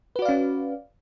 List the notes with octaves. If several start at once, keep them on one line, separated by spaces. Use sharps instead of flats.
C#4 F#4 B4 D5 F5